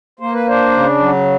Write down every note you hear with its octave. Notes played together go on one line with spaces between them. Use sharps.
A#3 C5
B4
D4 C5
C#3
F#3